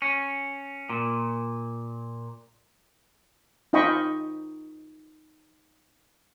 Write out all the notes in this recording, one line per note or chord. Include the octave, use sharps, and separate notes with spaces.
C#4
A#2
D#4 F4 D#5 G5 B5 C#6